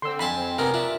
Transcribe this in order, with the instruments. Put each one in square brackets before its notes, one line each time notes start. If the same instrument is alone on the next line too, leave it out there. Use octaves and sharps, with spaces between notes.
[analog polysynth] D3 C4 [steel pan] C6 E6
[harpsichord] F2 G#5 A5 [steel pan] B5
[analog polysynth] C4
[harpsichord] C3 B3 C#4 [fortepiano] A#4
[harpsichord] D4 [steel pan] F4 [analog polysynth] E5